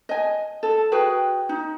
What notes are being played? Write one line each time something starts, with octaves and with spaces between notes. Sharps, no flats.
D#5 G#5
A4
F#4 G#4 B4 G5
D#4